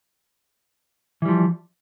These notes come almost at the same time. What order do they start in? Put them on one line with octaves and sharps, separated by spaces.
E3 G3 F3